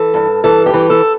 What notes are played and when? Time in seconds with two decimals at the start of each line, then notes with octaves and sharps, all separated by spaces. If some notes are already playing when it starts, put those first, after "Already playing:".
Already playing: E3 A4
0.14 G2
0.44 E3 A4
0.66 G4
0.74 E3
0.90 A4